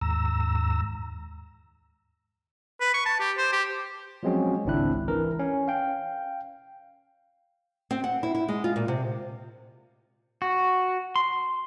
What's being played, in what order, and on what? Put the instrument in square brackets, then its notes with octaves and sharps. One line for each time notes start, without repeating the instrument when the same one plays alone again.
[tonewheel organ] D#2 G#2 A#5 E6
[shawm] B4
C#6
A5
G4
C5
G4
[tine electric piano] F3 F#3 G#3 C4 C#4 F#4
G#1 C#2 C4 D4 E4 F#6
E3 A#4
C#4
F5 G5
[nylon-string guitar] C4
F#5
E4
E4
G#3
F4
A#2
C3
[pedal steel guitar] F#4
C6